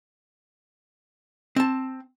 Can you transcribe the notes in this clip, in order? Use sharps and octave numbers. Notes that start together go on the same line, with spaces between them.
C4 A5